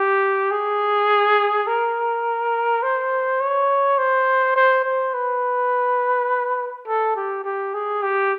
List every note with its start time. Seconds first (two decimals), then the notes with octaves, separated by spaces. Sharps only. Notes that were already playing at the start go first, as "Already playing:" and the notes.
Already playing: G4
0.51 G#4
1.67 A#4
2.82 C5
3.40 C#5
3.98 C5
4.56 C5
4.85 C5
5.14 B4
6.87 A4
7.16 G4
7.44 G4
7.74 G#4
8.03 G4